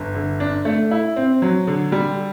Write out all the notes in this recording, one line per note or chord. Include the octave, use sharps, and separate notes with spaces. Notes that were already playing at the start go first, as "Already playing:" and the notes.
Already playing: G1
D3
D4
A3
E4
C4
F#3
D3
G3